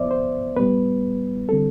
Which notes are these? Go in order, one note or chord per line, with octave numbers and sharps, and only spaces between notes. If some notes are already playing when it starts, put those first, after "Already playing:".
Already playing: A2 F3 B3 C5 D5 E5
C5
A2 G3 B3 B4
D3 G3 C4 A4